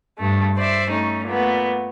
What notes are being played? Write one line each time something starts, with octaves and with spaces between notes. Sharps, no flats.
G2 A3
C5 D5 E5
A3 C#4 D#4
A#2 A3 B3